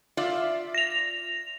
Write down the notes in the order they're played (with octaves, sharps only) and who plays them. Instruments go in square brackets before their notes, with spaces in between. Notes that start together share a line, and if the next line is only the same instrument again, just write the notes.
[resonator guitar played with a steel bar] F4 D5 E5
[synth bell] A#6 F7